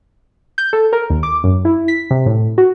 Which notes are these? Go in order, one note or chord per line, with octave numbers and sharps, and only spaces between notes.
G6
A4
A#4
D#2
D6
F#2
E4
B6
C3
A2
F#4